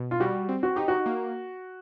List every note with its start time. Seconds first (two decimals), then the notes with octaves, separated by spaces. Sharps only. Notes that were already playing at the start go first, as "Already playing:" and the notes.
Already playing: B2
0.11 F4
0.20 G3 F#4
0.49 C4
0.63 F#4
0.76 D#4 G4
0.88 F#4
1.06 A#3